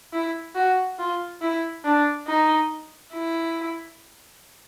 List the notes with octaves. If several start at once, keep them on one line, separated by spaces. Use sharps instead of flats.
E4
F#4
F4
E4
D4
D#4
E4